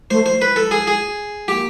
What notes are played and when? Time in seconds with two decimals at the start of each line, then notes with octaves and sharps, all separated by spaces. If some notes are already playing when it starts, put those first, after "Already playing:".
0.10 A3 C5
0.26 C5
0.42 B4
0.56 A4
0.71 G#4
0.87 G#4
1.48 A#3 G4